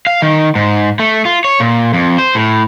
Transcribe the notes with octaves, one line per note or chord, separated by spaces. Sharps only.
F5
D#3
G#2
A3
F4
C#5
A#2
F2
C5
A2